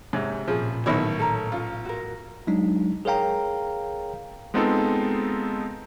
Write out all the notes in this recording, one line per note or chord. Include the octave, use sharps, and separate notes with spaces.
G#2 C3 C#5
A1 A#2 F3 C#4 G#4 B5
B1 D#3 E4 B4 C#5 A5
A4 A#4 A#5
C#4 F4
F#4 A#4
F#3 G#3 D4 D#4
G#4 A#4 C#5 F5 G5 A#5
G#3 B3 C4 D#4 F4 A4